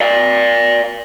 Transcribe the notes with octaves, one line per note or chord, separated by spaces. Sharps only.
D5 F5